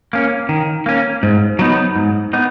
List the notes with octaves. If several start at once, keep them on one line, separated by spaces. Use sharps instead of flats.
A#3 C#4
D#3
A#3 C#4
G#2
F#3 B3 D#4
G#2
B3 D#4